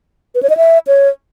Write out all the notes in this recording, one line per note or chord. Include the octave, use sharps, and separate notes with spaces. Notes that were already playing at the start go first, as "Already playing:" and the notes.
B4
C#5
D#5
E5
C#5